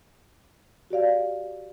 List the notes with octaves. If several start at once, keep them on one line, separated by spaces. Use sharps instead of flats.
F#4 G4 D5 F5